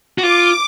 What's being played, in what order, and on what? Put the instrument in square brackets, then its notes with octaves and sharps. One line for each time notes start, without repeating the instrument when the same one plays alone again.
[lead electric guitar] F#4
[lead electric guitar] F4 [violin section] D6